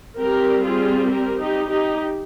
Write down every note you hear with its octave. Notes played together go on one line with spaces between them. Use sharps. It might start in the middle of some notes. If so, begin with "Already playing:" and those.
G3 C4 G4 A#4
F4 G#4
G4 A#4
D#4 G4
D#4 G4